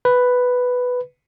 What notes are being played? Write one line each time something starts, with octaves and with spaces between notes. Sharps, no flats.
B4